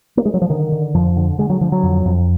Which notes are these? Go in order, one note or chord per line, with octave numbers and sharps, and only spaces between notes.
A#3
G#3
F#3
F3
D3 D#3
D3
F2 F3
D3
D3 G#3
F#3
D3 F3
F#3
F2
F2